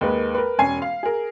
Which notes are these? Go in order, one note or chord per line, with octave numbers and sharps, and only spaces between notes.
D#2 G#3 A#4 B4
A#4 B4
E1 C#4 G#5 C7
F5
G#4 A#4